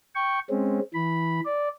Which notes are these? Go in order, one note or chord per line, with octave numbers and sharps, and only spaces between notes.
G5 C#6
G#3 C4 C#4
E3 B5
D5